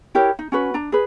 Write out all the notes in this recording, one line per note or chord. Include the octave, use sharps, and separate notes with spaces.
E4 G4 A#4 C#5
D#4
C#4 F#4 B4
D4 A#5
G#4 B4